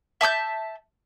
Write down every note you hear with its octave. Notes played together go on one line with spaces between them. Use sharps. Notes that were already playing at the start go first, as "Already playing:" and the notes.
E5 A5 E6 G6